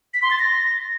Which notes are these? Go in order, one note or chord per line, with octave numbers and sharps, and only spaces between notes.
B6
C6
A6
A#6